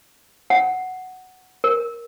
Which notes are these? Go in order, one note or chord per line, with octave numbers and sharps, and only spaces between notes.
F#5
A#4